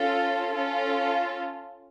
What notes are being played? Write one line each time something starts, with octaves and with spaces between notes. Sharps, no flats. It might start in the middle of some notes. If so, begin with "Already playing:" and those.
Already playing: C#4 F4 A4
C#4 F4 A4